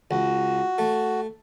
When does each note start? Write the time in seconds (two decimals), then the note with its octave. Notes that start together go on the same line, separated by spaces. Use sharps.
0.11 C#2 F#4
0.78 A3